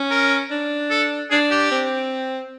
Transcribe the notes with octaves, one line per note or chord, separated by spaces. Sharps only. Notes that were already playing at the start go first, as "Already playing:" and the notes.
Already playing: C#4
A#4
D4
A4
D4 G#4
G4
C4